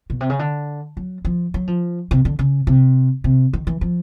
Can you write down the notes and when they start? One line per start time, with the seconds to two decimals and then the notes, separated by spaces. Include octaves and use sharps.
0.10 B2
0.21 C3
0.30 C#3
0.39 D3
0.97 F#3
1.25 F3
1.54 F#3
1.67 F3
2.11 C3
2.25 D3
2.39 C#3
2.67 C3
3.24 C3
3.53 D#3
3.67 E3
3.81 F3